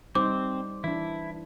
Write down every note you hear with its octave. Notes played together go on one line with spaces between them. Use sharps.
G3 C4 D#4 C5 D6
E3 D4 E4